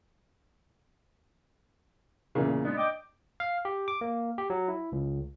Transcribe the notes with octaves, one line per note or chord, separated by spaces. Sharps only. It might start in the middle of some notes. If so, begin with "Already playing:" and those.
E2 A#2 C#3
G#3 B3 D4
D#5 G5 D6
F5
G4
D6
A#3
G4
F#3
E4
C#2